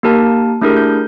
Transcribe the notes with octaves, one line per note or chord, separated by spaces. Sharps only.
A#3 D#4 G4 A#4 A5
A3 D4 E4 G4 G#4 A#4
G6